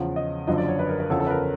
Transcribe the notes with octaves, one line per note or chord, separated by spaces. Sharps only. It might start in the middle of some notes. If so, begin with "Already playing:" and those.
Already playing: E2 C#3 F3
D#5
F#1 F#2 D3 F3 D#5
D5
C#5
B4
A#4
A#4
E2 C#3 F3 A4
A4
B4
A#4